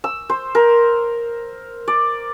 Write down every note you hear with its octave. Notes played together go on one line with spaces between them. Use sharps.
E6
C5
A#4
D5